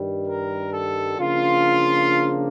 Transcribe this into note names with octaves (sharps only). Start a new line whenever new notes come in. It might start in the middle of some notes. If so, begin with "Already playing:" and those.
Already playing: G2 D#3 G3
A#4
A4
C#3 F3 A#3 D4 F4